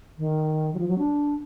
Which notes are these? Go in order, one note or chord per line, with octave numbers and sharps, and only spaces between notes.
D#3
F#3
F3
F#3
D4